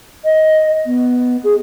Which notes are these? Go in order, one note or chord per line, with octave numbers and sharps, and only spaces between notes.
D#5
B3
G#4